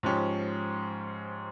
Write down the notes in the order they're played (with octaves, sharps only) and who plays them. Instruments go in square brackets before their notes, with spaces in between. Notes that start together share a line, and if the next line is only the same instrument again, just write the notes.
[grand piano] G#2 F3 G#3 C#4 G4